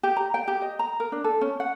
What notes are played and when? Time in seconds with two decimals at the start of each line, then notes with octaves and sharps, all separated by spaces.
0.03 G4
0.17 A#5
0.34 G5
0.48 G4
0.62 D#5
0.79 A#5
1.00 A#4
1.12 D4
1.24 A4
1.41 C#4
1.60 F#5